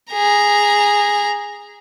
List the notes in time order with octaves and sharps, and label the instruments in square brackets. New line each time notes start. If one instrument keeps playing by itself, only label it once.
[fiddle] G#4 A#5